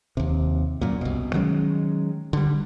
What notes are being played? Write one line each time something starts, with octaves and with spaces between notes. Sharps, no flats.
D#2 C3
F#2 A#2
C2 B2
D#3 F#3 G#3 C#4
D3 G3